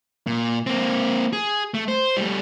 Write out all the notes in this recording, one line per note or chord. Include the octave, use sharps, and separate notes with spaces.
A#2
A#3 C4
G#4
A3
C5
G3 A3